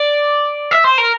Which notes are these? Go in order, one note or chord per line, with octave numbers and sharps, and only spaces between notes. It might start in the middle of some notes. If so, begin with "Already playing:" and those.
Already playing: D5
E5
C5
A#4